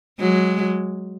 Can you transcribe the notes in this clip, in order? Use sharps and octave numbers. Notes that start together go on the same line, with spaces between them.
F#3 G#3